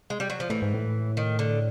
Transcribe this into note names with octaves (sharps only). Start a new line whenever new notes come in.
G#3
G3
F#3
F3
A2 E3
G#2
A2
D#3
D3